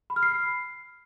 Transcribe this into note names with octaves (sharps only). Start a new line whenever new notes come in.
B5
F6
C7